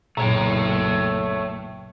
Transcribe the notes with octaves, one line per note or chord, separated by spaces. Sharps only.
F#1 B1 A#2 A3 C#5 G5